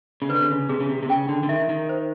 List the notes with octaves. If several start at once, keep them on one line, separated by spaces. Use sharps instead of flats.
C#3
D3 B4
C3
C#3
C3 G#4
C#3
C3
C3
C#3 G5
D3
D3
D#3 E5
D#3
C5